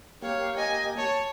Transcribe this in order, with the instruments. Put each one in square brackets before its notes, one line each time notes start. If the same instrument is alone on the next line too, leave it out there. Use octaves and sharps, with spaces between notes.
[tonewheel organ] A#3 G4 [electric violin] C#5 [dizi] F5
[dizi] D#5 [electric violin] G#5
[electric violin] C#5 [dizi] A5